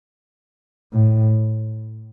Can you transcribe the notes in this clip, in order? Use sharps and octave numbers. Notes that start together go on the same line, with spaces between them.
A2